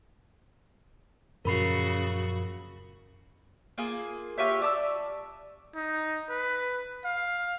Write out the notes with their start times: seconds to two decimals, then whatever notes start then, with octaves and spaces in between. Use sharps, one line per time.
1.45 F#2 A#2 C#3 F3 F#4 A#4 B5 C7
3.78 A#3 F4 G#4
4.38 F4 G4 C#5 E5
4.62 D5 A5 D#6 E6
5.76 D#4
6.29 B4
7.05 F5